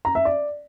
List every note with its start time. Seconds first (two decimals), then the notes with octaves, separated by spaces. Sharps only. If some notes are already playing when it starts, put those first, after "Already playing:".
0.05 A#5
0.15 E5
0.25 D5